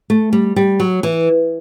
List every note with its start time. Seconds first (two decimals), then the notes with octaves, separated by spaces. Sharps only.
0.10 A3
0.33 G3
0.56 G3
0.80 F#3
1.03 E3